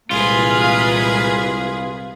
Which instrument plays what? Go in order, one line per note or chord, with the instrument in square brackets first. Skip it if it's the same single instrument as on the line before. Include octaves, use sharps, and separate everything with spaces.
[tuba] C2 [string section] A#2 E3 G#3 [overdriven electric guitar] F4 [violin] G#4 B4